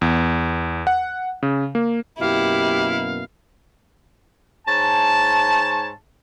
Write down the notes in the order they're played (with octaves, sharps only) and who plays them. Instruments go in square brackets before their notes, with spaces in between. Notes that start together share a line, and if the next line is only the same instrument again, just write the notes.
[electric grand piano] E2
F#5
C#3
A#3
[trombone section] F#2 B2 A#3 [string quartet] E4 [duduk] G4 [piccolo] F5
[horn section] G#2 C#5 A5